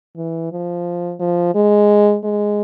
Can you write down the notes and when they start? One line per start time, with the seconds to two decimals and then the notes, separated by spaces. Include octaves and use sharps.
0.16 E3
0.52 F3
1.20 F3
1.55 G#3
2.24 G#3